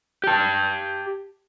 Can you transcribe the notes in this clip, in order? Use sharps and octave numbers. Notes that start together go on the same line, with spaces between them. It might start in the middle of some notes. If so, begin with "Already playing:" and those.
G4 A5